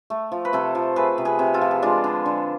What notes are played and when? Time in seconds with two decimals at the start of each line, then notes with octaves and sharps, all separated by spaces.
0.10 A3
0.32 F3
0.45 B4
0.53 C3 A4 C5
0.75 F3
0.96 A3 G#4 B4
1.18 C3
1.25 G#4 B4
1.39 C3
1.54 F4 A4
1.61 F3
1.71 G#4
1.82 G#3 D4 F4
2.04 D3
2.26 D3